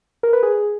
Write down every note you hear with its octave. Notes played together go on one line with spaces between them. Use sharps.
A#4
B4
G#4